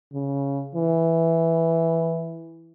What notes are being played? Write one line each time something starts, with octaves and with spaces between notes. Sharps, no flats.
C#3
E3